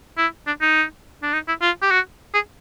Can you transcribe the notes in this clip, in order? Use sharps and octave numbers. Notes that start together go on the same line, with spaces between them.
E4
D4
D#4
D4
D#4
E4
F4
G4
F#4
G#4